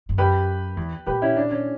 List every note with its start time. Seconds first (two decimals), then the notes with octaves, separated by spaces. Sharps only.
0.09 G2
0.18 F#2 G4 B4
0.77 E2
1.07 A#2 G4 B4
1.22 C#4 E4
1.37 D4
1.51 C#4